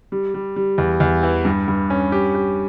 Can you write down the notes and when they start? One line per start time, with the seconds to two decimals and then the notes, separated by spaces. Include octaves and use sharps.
0.12 G3
0.34 G3
0.56 G3
0.78 E2
1.00 E2
1.23 E3
1.45 G2
1.68 G2
1.90 C#4
2.12 G4
2.35 G4